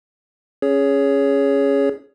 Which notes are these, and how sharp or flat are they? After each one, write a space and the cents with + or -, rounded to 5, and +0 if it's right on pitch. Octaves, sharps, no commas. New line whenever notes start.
C#4 -5 G#4 +0 C#5 +15